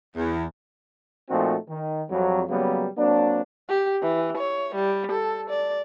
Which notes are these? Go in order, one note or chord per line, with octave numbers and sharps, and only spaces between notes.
E2
A#2 F3 A3 C4 D#4 F#4
D#3
F2 F#3 G3
C#3 F#3 G3 A#3 B3
F#3 A#3 C4 D4
G4
E3
C#5
G3
A4
D5